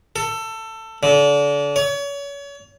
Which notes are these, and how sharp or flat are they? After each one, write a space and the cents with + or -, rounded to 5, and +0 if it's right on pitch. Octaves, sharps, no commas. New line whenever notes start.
A4 +20
D3 -35
C#5 +35